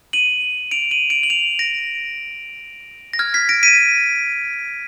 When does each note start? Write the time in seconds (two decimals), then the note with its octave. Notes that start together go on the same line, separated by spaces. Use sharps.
0.13 D#7 F#7
0.71 D7 F7
0.91 D#7 F#7
1.10 D7 F7
1.23 F#7
1.30 D7 F7
1.59 A#6 D7
3.13 A#6
3.19 F6 G#6
3.34 G#6 B6
3.49 A#6 D7
3.63 B6 D#7